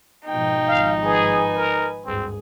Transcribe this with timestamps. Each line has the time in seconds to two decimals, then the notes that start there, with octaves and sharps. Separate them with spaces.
0.28 G#2 B2 F3 D#4 G5
0.67 G#1 F3 F5
1.03 G#4 B4 G#5
1.55 A#4
2.05 G#1 D2 G2 C4 G#4